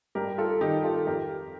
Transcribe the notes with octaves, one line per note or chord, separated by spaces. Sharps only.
G2 G4 A#4
F4 A4
D#3 D#4 G4
F4 A4
F2 G4 A#4